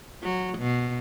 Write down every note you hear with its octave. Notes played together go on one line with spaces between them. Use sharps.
F#3
B2